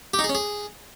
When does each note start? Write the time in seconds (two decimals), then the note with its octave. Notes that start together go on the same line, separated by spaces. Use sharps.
0.14 G4
0.19 D#4
0.24 G#4
0.29 C#4
0.35 G#4